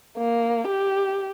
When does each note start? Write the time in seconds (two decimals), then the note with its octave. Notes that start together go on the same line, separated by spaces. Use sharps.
0.18 A#3
0.67 G4